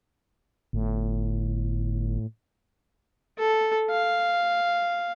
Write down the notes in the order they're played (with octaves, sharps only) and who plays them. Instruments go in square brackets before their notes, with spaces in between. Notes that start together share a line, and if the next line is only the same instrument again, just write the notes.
[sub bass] G1 [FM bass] A2
[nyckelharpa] A4
F5